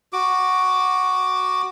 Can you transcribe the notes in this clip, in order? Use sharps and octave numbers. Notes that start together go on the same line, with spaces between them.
F#4 D6